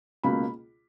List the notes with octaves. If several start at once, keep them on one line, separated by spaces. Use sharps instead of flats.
C#2 B2 A#3 B5